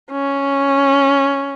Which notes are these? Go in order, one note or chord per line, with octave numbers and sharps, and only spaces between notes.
C#4